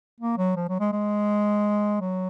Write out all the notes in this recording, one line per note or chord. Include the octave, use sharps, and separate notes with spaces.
A#3
F#3
F3
F#3
G#3
G#3
F#3